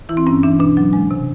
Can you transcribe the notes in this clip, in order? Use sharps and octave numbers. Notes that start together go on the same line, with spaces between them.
E3 E4
C4
G2 C#4
E3 D4
B2 D4
F#3
G#3
C3